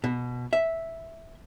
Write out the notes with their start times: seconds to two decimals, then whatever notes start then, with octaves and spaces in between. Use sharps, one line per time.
0.04 B2
0.53 E5